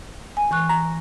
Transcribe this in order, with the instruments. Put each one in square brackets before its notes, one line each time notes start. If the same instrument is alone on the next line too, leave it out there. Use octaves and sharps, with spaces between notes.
[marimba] G#5
E3 C#6 F#6
[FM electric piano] A#5